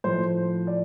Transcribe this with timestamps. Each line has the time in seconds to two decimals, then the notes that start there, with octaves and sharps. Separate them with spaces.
0.04 A2 F3 C5
0.67 D5